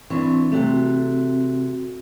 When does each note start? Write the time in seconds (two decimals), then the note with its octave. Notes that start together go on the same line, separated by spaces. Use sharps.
0.10 E3 C4 D4 C#6
0.52 C3 A3 C4 F#4